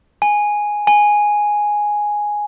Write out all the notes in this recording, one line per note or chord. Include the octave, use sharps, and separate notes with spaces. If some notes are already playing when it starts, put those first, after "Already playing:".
G#5
G#5